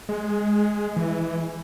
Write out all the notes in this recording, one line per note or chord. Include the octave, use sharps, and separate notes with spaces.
G#3
E3